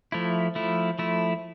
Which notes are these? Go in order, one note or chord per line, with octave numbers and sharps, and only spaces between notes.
F3 A3 E4
F3 A3 E4
F3 A3 E4